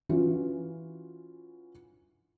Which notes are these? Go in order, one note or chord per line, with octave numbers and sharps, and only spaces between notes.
E3 C#4 F4 F#4